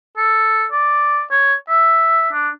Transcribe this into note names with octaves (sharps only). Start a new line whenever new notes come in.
A4
D5
C#5
E5
D4